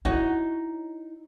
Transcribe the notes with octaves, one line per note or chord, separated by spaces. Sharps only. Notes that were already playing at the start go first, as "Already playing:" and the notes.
D#4 E4 F#4 C#5 D#5